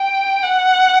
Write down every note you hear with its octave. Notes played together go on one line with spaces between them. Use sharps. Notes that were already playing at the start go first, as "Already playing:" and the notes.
Already playing: G5
F#5